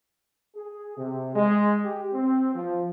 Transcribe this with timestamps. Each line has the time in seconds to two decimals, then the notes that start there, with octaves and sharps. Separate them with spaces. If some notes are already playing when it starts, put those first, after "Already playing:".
0.56 G#4
0.97 C3
1.34 G#3
1.85 G4
2.13 C4
2.55 F3